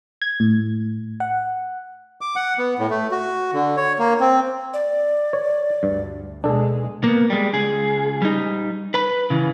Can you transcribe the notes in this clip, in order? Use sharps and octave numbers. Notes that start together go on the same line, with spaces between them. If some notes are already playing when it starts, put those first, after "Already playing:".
G#6
A2
F#5
D6
F#5
B3
A2
A3
F#4
D3
C#5
A#3
C4
D5
C#5
D2 G2
B2 G#3 D4 A4
A#3 B3
G3 G#3
C#2 G#4
G3 D#4
B4 B5
C#3 E3